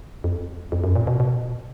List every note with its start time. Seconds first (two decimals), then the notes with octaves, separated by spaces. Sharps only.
0.24 F2
0.72 F2
0.84 F#2
0.96 A#2
1.07 B2
1.20 B2